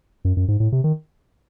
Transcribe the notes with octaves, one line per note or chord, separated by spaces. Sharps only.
F#2
F#2
G#2
A2
C3
D#3